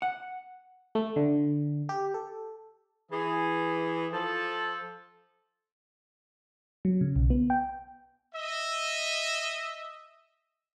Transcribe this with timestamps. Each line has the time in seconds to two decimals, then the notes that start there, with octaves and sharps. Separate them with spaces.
0.02 F#5
0.95 A3
1.16 D3
1.89 G4
2.14 A4
3.11 E3 G#4
4.12 F3 A4
6.85 F#3
7.01 C#3
7.16 B1
7.30 B3
7.50 G5
8.33 D#5 E5